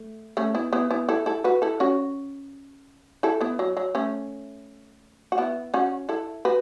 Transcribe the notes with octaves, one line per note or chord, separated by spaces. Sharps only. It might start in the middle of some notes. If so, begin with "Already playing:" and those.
Already playing: A3
A3 C#4
B3 E4
B3 E4
B3 E4
E4 A4
E4 A4
F#4 B4
E4 A4
C#4 F#4
E4 A4
B3 E4
F#3
F#3
A3 C#4
F#4
B3 E4
C#4 F#4
E4 A4
F#4 B4